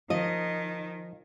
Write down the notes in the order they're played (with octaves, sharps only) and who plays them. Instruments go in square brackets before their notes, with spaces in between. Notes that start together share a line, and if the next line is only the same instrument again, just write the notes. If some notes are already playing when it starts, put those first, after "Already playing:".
[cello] D#3 [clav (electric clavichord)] F3 [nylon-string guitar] D#5